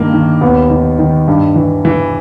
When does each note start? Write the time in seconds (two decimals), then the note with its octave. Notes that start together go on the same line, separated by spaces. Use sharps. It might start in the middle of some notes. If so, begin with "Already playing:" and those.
Already playing: G2 D#3 A#3
0.14 D#3
0.41 D#2 B3
0.70 D#3
0.99 D#3
1.28 G2
1.56 E3
1.85 E3